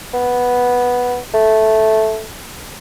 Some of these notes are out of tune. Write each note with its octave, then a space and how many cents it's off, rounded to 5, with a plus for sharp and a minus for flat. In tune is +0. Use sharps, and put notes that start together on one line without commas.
B3 -5
A3 -5